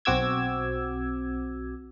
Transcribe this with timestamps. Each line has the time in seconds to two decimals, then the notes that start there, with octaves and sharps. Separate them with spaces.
0.05 B1 C4 F#4 D6 E6 G#6